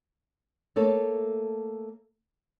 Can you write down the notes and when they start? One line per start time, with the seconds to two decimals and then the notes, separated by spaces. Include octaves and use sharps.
0.76 A3 A#3 A4 C#5